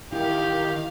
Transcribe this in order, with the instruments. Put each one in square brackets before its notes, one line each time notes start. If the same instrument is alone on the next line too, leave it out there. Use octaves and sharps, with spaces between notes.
[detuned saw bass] D#3 [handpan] E4 [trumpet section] G4 [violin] F5